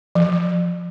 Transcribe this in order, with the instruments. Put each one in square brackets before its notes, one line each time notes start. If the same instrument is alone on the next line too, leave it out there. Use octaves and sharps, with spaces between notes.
[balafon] F3